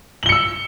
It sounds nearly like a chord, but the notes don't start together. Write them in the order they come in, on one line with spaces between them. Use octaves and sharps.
F#7 G7 C#7 E6